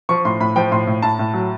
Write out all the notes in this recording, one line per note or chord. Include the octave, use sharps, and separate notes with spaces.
F3 C#6
A2 C6
A2 B5
F3 G5
A2 C6
A2
A2 A5
A2
F#3